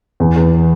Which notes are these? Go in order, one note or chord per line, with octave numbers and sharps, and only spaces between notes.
E2
E2